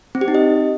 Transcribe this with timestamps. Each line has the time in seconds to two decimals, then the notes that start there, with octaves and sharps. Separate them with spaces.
0.15 C4
0.21 G4
0.28 D#4
0.35 D#5